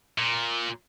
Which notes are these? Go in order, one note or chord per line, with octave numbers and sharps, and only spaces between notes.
A#2